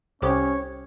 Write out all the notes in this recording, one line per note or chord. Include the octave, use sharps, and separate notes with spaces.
C2 C#4 G4 A4 C5 C#5 D#6